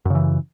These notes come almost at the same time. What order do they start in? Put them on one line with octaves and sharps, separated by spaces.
F#2 C#3 E3